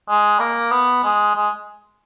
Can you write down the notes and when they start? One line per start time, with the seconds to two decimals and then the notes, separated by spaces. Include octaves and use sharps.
0.09 G#3
0.40 A#3
0.71 B3
1.04 G#3
1.35 G#3